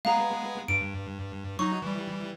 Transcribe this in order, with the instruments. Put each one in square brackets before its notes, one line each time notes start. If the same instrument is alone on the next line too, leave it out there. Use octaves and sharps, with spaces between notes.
[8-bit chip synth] G#3 B3 G#4 [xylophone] F5 A#5
[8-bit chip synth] G2 [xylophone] D7
[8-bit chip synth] F#3 D#4 [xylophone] C#6
[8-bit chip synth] E3 G3